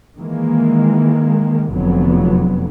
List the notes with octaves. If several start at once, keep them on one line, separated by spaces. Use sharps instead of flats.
D#3 E3 G#3 A#3
F1 F2 D3 F#3 B3